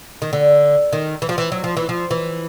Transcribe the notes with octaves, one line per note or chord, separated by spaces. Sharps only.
D#3
D3
D#3
E3
F3
E3
F#3
F3
E3
F3
E3